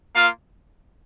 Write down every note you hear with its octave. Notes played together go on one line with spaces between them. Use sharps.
A#3 F4 F5